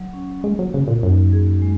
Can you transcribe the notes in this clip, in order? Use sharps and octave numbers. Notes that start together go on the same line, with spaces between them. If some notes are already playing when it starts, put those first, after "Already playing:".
Already playing: F#3
C#4
G#3 A#3
F#3
C#3 F#4
A#2
F#2 D#4
G#4
G#3